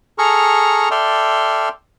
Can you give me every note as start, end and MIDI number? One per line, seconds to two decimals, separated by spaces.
0.18 0.89 68
0.18 0.89 69
0.18 0.89 82
0.18 0.89 85
0.18 0.89 89
0.91 1.69 69
0.91 1.69 74
0.91 1.69 76
0.91 1.69 79
0.91 1.69 84
0.91 1.69 89